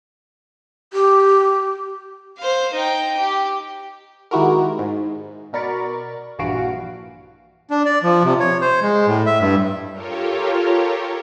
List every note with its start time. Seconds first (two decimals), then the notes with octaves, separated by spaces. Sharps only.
0.93 G4
2.38 C5 F5
2.73 D#4 G5
3.17 G4
4.31 D#3 G#3 E4 F#4 G4 A#4
4.79 G#2
5.53 B2 A#4 D5 B5 C#6 A6
6.39 A#1 G2 E3 F#4 F5 D7
7.70 D4
7.86 D5
8.03 F3
8.24 C3
8.40 C#5
8.61 C5
8.82 G#3
9.07 A2
9.26 E5
9.40 G2
9.92 F4 G4 A4 A#4 C#5